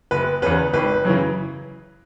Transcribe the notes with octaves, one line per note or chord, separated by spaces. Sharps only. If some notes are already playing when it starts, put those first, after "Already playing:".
F#1 B4
E2 C#3 B4
G#1 B4
F#2 C#3 E3